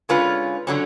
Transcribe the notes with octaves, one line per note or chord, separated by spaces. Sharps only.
D3 G#3 C#4 F4 B4
D3 F#3 C#4